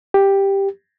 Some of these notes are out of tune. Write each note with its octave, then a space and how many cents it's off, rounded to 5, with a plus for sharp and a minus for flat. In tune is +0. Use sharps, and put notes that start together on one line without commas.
G4 +5